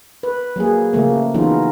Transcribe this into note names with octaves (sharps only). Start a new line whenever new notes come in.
B4
F#3 A#3 G#4
C#3 F3 A3 A#3
E3 F#3 B3 C#4 D#4 F4